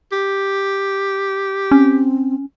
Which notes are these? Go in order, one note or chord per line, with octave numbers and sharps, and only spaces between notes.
G4
C4 C#4